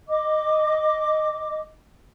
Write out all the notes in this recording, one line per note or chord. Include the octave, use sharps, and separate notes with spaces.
D#5 D6